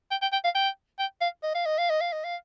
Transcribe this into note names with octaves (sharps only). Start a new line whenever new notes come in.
G5
G5
G5
F5
G5
G5
F5
D#5
F5
D#5
F5
D#5
F5
D#5
F5